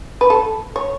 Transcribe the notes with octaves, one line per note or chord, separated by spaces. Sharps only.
B4
A4
C#5